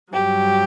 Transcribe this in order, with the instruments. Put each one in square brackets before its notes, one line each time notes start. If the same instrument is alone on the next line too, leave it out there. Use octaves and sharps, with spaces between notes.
[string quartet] G2 F#3 G4